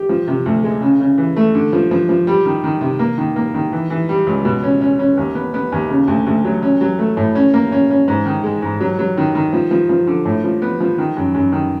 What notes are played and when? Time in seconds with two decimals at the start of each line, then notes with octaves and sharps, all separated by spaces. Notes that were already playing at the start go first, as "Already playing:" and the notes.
Already playing: G4
0.09 F3
0.28 C3
0.46 D2
0.64 G#3
0.81 C#3
1.00 C#3
1.18 E3
1.36 A3
1.55 D3
1.73 F3
1.91 F3
2.09 F3
2.27 G3
2.45 D#3
2.64 D#3
2.81 C3
2.99 A#3
3.18 D#3
3.36 A#3
3.54 D#3
3.72 E3
3.90 E3
4.09 G3
4.27 C#2
4.45 B2
4.63 C#4
4.81 C#4
4.99 C#4
5.17 D#2
5.35 B3
5.54 B3
5.72 D#2
5.90 C#3
6.08 D2
6.27 D2
6.45 F#3
6.62 C#4
6.81 F#3
6.99 A3
7.17 A2
7.35 C#4
7.54 A#3
7.72 C#4
7.90 C#4
8.08 G#2
8.25 D#3
8.44 G#3
8.62 G#2
8.80 F#3
8.99 F#3
9.17 D#3
9.35 D#3
9.53 F3
9.71 F3
9.89 F3
10.07 D3
10.25 A2
10.44 F3
10.62 B3
10.80 F3
10.98 D#3
11.17 F#2
11.34 F#2
11.52 D#3